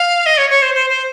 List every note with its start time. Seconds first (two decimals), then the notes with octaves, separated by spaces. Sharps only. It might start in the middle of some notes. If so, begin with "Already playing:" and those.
Already playing: F5
0.26 D#5
0.38 C#5
0.50 C#5
0.62 C5
0.74 C5
0.90 C5